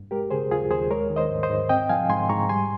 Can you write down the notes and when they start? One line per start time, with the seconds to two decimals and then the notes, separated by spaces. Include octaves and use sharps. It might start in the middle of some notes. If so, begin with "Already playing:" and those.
Already playing: G2
0.11 G#3 G4 A#4
0.31 C#3 G#4 C5
0.50 D#2 F4 G#4
0.71 D#2 G#4 C5
0.91 G#3 A#4 C#5
1.10 D#3
1.16 C5 D#5
1.30 G#2
1.43 C5 D#5
1.50 G#2
1.69 C4 D#5 G5
1.89 F3 F5 G#5
2.09 G#2 G#5 C6
2.29 G#2 A#5 C#6
2.49 G3 G#5 C6